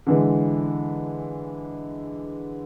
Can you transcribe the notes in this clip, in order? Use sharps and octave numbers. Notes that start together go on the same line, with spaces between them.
D3 E3 G#3